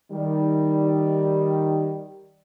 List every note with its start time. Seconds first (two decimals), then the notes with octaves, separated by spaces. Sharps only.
0.12 D#3 G3